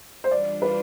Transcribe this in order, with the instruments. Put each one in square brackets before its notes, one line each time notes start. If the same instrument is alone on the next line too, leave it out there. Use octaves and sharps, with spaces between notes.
[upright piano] C5
[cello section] E3 G3 D4 F4 [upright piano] D5
[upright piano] B4